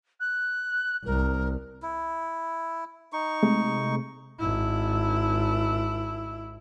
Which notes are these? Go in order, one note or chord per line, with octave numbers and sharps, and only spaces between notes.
F#6
C2 A#4
E4
D#4 C#6
C3 G#3 A3
G#1 E4